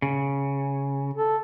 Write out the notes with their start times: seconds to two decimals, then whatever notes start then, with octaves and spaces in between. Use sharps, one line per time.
0.02 C#3
1.14 A4